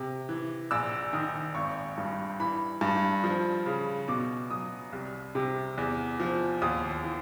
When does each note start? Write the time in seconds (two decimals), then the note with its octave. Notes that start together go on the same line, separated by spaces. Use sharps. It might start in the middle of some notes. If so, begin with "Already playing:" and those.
Already playing: C3
0.29 E3
0.71 A#1 E6
1.13 D#3 D#6
1.55 G#1 C#6
1.98 G2
2.40 E3 B5
2.81 G2
3.24 F3
3.66 C#3
4.08 B2 D6
4.50 F#3 D#6
4.92 C2
5.35 C3
5.78 E2
6.20 F3
6.62 D#2 D#6
7.04 E3